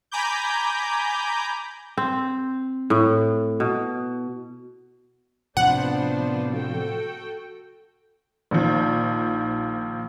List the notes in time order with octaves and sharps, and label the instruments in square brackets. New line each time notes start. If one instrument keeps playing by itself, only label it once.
[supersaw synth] G#5 A#5 B5 D6 G6
[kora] C4
A2
B2
[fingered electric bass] A2 C3 [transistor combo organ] F3 [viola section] B3 D4 C5 [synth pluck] F#5
[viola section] F#4 A4 G5
[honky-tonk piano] A#1 D#3 F3